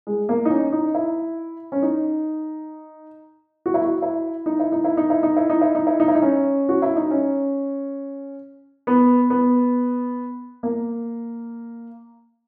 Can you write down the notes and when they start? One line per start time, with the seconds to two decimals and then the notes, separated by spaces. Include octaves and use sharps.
0.07 G#3
0.29 A#3
0.45 D#4
0.50 C#4
0.73 D#4
0.95 E4
1.72 C#4
1.82 D#4
3.66 F#4
3.74 E4
3.82 F#4
4.02 E4
4.46 D#4
4.60 E4
4.72 D#4
4.84 E4
4.97 D#4
5.10 E4
5.23 D#4
5.36 E4
5.50 D#4
5.61 E4
5.75 D#4
5.87 E4
6.00 D#4
6.08 E4
6.15 D#4
6.22 C#4
6.69 F#4
6.82 E4
6.96 D#4
7.11 C#4
8.87 B3
9.30 B3
10.63 A#3